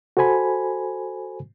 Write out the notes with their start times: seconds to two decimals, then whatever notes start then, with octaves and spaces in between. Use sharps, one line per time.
0.17 F#4 A4 C5 G#5 B5